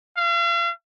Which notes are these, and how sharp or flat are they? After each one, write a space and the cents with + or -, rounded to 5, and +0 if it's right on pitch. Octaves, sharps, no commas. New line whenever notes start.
F5 -40